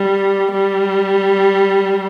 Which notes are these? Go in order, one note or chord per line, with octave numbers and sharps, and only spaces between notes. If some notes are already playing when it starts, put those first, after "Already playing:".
Already playing: G3
G3